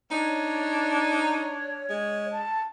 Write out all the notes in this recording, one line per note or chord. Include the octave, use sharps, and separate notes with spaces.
D4 D#4 C#5
G#3
A5